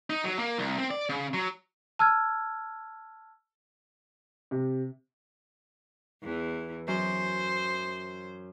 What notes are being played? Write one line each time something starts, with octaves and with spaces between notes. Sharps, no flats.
D#4
F#3
A#3
C2
C4
D5
C#3
F#3
A5 E6 F6 G#6
C3
E2 E3
F#2 C5